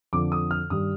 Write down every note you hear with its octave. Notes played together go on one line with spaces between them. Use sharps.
F2 D3 F3 D6
D#6
F6
G2 D#3 G3 D#6